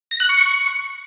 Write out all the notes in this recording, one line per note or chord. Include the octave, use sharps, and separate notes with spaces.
A#6
F#6
C#6